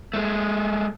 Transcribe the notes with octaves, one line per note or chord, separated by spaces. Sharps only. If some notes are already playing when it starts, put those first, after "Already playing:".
G#3 A3